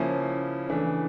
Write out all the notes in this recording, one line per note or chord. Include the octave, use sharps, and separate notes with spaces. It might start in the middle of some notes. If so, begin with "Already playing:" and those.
Already playing: C#3 F3 A#3 C#4 E4
C#3 E3 A3 D4